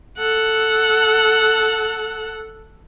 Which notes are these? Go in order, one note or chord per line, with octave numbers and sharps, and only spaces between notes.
A4 F#5